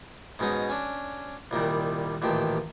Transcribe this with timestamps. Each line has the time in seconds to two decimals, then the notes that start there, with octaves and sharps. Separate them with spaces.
0.39 G#2 B2 C#4 D#4
0.70 C#4 D4
1.51 C2 A#2 D#3 G3
2.22 A1 A#2 D#3 G4 A5